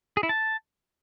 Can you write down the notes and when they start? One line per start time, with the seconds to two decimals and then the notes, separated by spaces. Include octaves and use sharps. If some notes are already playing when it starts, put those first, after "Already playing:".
0.17 G#4
0.23 E4
0.29 A5